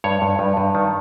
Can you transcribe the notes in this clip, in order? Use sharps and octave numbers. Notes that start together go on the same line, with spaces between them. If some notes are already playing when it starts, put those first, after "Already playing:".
G2 C#5
G2
G2
G2
D#3